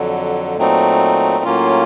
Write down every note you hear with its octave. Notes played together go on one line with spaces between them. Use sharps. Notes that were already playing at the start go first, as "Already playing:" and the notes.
Already playing: F2 D3 F#3
A#2 F#3 A3 C4 D#4
A2 F#3 A#3 C#4 F4